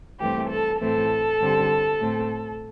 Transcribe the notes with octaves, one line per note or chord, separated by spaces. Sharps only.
G2 E3 A3 C4 G4
A4
A2 E3 A3 C4 A4
G2 D3 G3 C4
A2 A3 C4